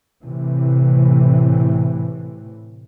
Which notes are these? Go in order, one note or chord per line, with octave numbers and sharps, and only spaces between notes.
A2 C3 E3